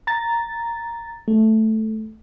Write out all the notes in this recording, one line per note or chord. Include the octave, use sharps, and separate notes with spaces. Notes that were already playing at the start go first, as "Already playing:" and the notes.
A#5 A6
A3